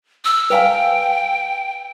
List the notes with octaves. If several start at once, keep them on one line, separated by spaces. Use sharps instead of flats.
E6
B4 F5 G5 G#5